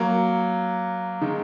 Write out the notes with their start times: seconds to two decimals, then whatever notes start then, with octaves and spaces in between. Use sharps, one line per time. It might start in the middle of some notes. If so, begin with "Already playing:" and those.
Already playing: F#3 A#3
1.22 D#3 G#3